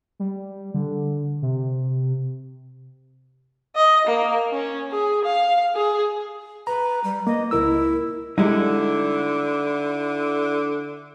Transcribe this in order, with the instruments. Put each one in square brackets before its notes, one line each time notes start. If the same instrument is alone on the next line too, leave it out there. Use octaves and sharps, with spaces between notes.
[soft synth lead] G3
D3
C3
[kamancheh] D#5
A#3
C#4
G#4
F5
G#4
[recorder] B4 [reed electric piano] A#5
[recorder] G3
[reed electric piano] A#3 [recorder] D#5
[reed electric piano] C#2 A#4 E6 [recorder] E4
[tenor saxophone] D3 [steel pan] G3 G#3 [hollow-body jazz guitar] D#4 E4